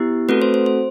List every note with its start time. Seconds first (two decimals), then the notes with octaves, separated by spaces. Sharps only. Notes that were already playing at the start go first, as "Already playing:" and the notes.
Already playing: B3 E4 G4
0.29 A3 C4 F#4 A4 B4
0.42 C5
0.54 C5
0.66 C5